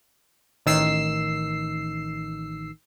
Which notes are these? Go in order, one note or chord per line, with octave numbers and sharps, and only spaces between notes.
A1 D#3 E6 C7